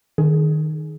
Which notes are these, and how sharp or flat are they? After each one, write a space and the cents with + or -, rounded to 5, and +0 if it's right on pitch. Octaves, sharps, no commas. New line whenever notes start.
D#3 -15 G#4 +20